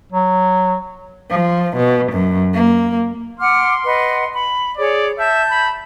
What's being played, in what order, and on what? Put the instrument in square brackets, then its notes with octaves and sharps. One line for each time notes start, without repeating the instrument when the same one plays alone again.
[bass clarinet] F#3
[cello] F3
B2
F#2
A#3
[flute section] F#5 D6 F6 [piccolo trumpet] C6
[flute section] B4 D#5 F#5
B5
[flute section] G#4 C#5 [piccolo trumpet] D5
[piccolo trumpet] E5 [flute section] A5 G6
[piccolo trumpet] B5